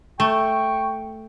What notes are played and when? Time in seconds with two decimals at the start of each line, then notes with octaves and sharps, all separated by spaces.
0.20 A3 G5 C#6